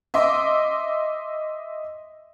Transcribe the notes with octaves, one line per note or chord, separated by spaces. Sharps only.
D#5 E5 C6 D6